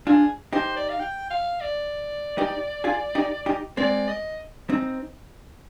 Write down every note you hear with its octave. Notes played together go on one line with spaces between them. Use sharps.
D4 F4 G#4
D#4 G4 C5
D5
F5
G5
F5
D5
D#4 G4
F4 G#4
D#4 G4
D#4 G4
G#3 C4 D5
D#5
C4 D#4